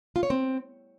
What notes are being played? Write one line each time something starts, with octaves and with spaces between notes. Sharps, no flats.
F4
C#5
C4